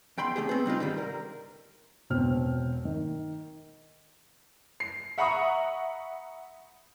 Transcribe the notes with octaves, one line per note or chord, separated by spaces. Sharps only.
E2 G5 B5 C6
C3 A3 G4 G#4
B3 C4
G3 D4 D#4 F4
G#2 D3 D#3 G3
A#4
E1 B2 C4 F6
D#3
C7
E5 F#5 A#5 B5 C#6 D#6